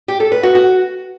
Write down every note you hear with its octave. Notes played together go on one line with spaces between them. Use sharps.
G4
A4
B4
F#4
F#4